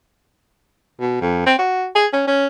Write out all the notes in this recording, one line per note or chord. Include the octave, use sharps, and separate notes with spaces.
B2
F2
C4
F#4
G#4
C#4
C#4